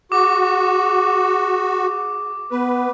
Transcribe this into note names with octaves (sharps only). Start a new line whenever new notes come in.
F#4 G#4 D6
B3 B4